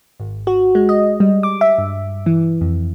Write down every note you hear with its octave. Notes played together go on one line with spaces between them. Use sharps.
G#1
F#4
G#3
D#5
G3
D6
E5
G2
E3
F2